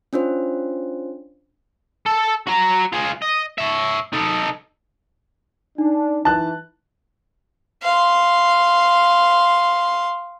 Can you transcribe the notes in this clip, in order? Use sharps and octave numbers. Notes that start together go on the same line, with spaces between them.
C#4 D4 F4 C5
A4
F#4 A#5
F4 G#4
D#5
C#5 E5
D#4 A4
D4 D#4
E3 A5 F#6
F5 C6